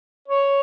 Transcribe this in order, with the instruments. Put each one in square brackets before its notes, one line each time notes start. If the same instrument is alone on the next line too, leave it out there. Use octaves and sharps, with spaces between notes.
[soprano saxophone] C#5